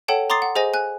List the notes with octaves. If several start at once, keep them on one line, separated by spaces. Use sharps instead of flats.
A4 C#5 F#5 G5 A5
A#5 C6 D6 D#6 A6 C7
F#5
G#4 C5 D#5 G#5 A#6
G#5 F#6